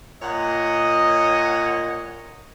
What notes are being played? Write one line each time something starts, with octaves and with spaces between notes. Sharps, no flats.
A#2 C#5 D#5 F#5